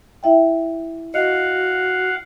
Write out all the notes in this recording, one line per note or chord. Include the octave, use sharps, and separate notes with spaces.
E4 E5 G5
F#4 D#5 F5 F#5